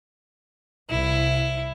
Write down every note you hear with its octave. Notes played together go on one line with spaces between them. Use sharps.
C2 E4